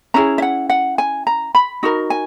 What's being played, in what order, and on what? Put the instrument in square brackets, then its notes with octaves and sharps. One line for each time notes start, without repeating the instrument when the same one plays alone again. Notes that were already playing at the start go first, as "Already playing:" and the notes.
[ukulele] C#4 E4 G#4 A#5
E5
F#5
F#5
G#5
A#5
B5
D#4 F#4 A#4
G#5